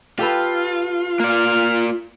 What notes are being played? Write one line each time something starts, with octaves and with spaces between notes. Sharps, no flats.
F4 G4 A4 B4
A#3 D5 F6